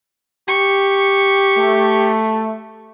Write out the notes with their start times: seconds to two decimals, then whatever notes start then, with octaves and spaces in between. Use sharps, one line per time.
0.48 G4 C#6
1.58 A3